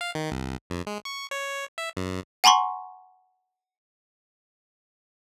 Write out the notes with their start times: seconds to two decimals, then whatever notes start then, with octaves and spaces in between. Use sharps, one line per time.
0.01 F5
0.15 D#3
0.32 C2
0.70 F2
0.87 G#3
1.05 C#6
1.31 C#5
1.78 E5
1.97 F#2
2.44 F#5 G#5 A#5 C6 C#6